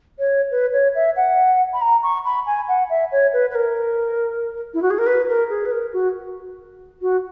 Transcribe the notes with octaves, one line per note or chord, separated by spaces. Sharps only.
C#5
B4
C#5
E5
F#5
B5
A#5
C#6
B5
G#5
F#5
E5
C#5
B4
B4
A#4
E4
F#4
G#4
A#4
B4
A#4
G#4
B4
A#4
F#4
F#4